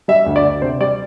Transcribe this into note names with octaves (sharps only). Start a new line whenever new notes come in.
G3 E5
D2
D5
D2
C3 C5
G3 D5